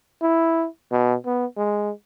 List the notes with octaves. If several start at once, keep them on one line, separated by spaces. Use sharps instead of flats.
E4
B2
B3
G#3